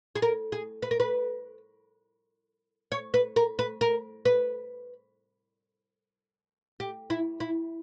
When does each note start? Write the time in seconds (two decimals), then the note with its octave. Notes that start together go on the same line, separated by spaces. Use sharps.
0.15 G#4
0.22 A#4
0.52 G#4
0.82 B4
0.91 A#4
1.00 B4
2.92 C#5
3.14 B4
3.36 A#4
3.59 B4
3.81 A#4
4.25 B4
6.80 G4
7.10 E4
7.40 E4